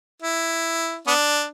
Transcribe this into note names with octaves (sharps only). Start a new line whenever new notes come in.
E4
B3 D4